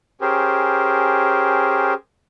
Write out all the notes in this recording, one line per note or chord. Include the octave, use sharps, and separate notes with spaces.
C#4 G4 G#4 A#4 C5